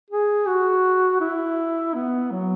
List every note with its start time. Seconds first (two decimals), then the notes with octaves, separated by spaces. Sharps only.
0.10 G#4
0.47 F#4
1.21 E4
1.95 B3
2.31 F#3